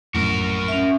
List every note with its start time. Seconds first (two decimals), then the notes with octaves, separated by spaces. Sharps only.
0.15 A#1 F#2 A2 F#4 A#4
0.68 C#4 E5